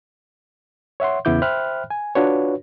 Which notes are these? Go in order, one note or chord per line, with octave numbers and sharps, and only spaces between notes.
C#5 E5 F#5 C6
E2 C#3 B3 E4 D6 G6
C5 E5 G5 B5 F6 F#6
G#5
D4 F4 F#4 B4 C#5